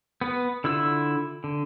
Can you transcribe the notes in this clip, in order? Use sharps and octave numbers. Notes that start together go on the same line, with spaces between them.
B3 B4
D3 E4 F4 E6
D3